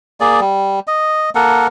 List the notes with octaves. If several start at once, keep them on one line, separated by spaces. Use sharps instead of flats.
A#3 G#4 D5
G3
D#5
A#3 A4 A#4 F#5